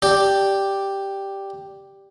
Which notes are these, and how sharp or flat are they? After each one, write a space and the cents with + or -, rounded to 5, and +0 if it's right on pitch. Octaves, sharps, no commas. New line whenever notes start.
G4 +0 D5 +0 A5 +20